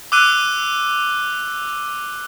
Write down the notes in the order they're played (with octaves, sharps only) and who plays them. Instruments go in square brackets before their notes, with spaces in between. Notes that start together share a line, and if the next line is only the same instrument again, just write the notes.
[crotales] D6 E6 F#6 D#7